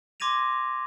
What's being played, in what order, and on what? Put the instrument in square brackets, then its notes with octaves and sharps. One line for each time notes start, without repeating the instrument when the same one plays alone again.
[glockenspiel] C6 D6 G#6 A#6 D#7 F7